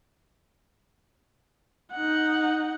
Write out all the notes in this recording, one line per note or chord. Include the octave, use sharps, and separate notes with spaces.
D#4 F#5